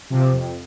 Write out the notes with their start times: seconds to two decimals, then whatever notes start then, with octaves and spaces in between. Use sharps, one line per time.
0.10 C3 F3
0.32 F2